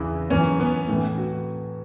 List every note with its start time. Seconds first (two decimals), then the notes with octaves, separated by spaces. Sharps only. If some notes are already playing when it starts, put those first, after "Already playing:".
Already playing: E2 C#3 E3 E4
0.30 F#2 E3 C#4
0.60 B3
0.88 A2 E3
1.17 F#4